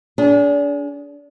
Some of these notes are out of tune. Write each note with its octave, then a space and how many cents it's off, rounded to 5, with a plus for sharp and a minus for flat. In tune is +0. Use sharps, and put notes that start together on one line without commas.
D4 -35 G#4 +0